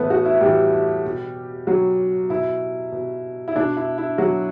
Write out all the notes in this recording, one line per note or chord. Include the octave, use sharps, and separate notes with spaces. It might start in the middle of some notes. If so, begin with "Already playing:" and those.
Already playing: A2 E3 A3 B3 A4 B4
F#4 F#5
E4 E5
A2 E3 G3 G4
B2
B2 F#3 F#4
B2 E4
B2
E4
B2 D4
E4
E4
B2 F#3 F#4